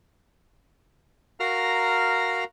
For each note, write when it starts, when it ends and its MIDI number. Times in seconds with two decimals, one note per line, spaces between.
1.40 2.44 66
1.40 2.44 70
1.40 2.44 77
1.40 2.44 82
1.40 2.44 89